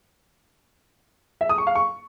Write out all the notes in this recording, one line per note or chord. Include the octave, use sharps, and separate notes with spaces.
E5
D#6
C#6
F5
C#6